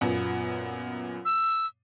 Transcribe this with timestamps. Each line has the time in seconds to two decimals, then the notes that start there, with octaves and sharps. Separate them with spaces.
0.01 F#2 A#2 B3
1.25 E6